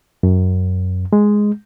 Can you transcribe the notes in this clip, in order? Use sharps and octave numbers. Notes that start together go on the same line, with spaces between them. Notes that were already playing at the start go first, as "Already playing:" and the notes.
F#2
G#3